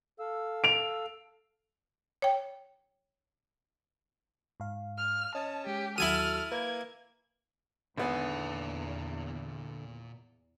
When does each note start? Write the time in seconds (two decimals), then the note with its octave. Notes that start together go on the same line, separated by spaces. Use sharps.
0.20 A4 F5 E6
0.64 D7 F7
2.22 C#5 G5
4.60 G#2 F5
4.98 F6
5.35 C#4 D#5 A5
5.67 G#3 G4
5.98 D#2 F#3 E4 F#4 A4 G#5 D#6 F6
6.52 A#3 B4 G#6
7.98 G#1 E2 A#2 D3 B3 G#5 D#6